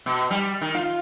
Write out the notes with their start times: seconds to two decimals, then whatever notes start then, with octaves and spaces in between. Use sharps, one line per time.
0.06 B2
0.31 G3
0.61 D#3
0.75 F4